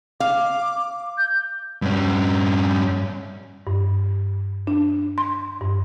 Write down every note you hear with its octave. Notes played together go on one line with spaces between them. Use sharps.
F5 D6
G6
G2 C#4
G2
D4
C6
G2